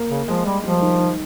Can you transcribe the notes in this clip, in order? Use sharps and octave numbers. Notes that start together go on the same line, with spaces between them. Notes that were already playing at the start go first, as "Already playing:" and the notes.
Already playing: A#3
C#3
F3 G#3
G3
F3 G3
D#3
D#3